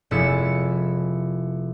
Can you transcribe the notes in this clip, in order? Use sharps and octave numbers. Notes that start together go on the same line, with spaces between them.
F1 G#3 E4 E6 A6 C#7